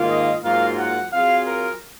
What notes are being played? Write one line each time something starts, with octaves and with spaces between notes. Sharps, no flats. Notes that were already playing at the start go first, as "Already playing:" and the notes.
Already playing: G#2 D#3 A#3 F4
D#5
G#2 F#3 A#3 F4 A#4 F5
F#5
F#3 C4 F4 G#4 F5
A#4